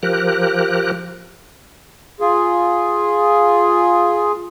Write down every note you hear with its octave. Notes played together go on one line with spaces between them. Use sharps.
F3 G4 A#4 F#6
F4 G#4